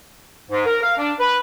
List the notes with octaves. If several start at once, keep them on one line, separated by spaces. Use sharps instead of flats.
G#2
A#4
F5
D4
B4